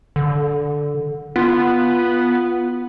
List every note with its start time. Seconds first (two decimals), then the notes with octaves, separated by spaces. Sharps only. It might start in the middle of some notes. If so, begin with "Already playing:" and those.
0.16 D3
1.36 B3 F4